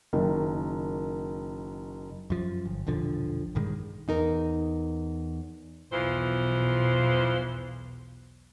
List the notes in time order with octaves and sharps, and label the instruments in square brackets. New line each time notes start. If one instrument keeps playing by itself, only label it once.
[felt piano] F#1 D#3
[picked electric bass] F#2 F3
G1
E1 A#1 D3 F3
A#1 G2 D#3 G#3
[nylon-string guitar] E2 D#4 A#4
[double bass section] B1 E2 [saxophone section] E3 F3 C5